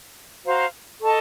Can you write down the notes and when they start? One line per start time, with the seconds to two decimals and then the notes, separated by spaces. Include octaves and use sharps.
0.45 F#4 C5 F5 A#5
1.02 A4 D#5 A5 C#6